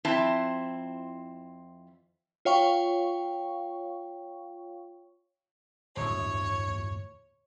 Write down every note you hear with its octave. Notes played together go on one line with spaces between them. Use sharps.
F2 C4 E4 C5 A5
F4 C#5 F5 G5 C#6
D1 G1 E2 C#5